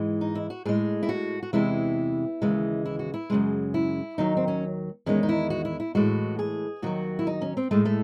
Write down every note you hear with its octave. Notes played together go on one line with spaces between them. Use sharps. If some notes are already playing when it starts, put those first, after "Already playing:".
Already playing: G#2 E3 G#3
D#4
E4
F#4
A2 G#3 G#4
E4
F#4
F#4
E2 C3 E3 G#3 E4
D#2 C#3 E3 G#3
E4
F#4
E4
F#2 C#3 G#3
E4
D#2 D#3 F#3 D#4
C4
C#4
E2 D#3 G#3 C#4
D#4
E4
F#4
E4
E4
A2 E3 G#3 F#4
G#4
D#2 D#3 F#3 F#4
E4
D#4
C#4
C4
A2 G#3 A3
A3